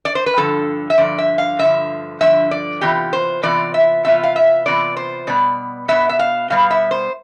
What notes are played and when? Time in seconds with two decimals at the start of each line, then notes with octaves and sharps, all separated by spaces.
0.05 D5
0.15 C5
0.26 B4
0.36 G2 D3 F3 A4
0.90 E5
0.98 G2 D3 F3 D5
1.18 E5
1.38 F5
1.59 G2 D3 F3 E5
2.21 G2 D3 F3 E5
2.51 D5
2.81 C3 E3 B3 F4 G4
3.13 C5
3.43 C3 E3 B3 F4 D5
3.74 E5
4.05 C3 E3 B3 F4 E5
4.23 F5
4.36 E5
4.66 C3 E3 B3 F4 D5
4.97 C5
5.27 B2 G3 B3 D5
5.88 B2 G3 B3 E5
6.09 E5
6.19 F5
6.50 B2 G3 B3 F5
6.71 E5
6.91 C5